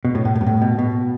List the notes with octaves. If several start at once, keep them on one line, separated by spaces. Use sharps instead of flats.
B2
A2
A2
A2
G2
A2
B2
B2